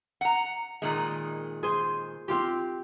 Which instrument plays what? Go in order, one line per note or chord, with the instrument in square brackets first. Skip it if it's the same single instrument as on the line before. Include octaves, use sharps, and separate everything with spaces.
[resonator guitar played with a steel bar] F#5 A#5
A#2 D#3 G#3
[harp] G#4 C5
C4 F4 G4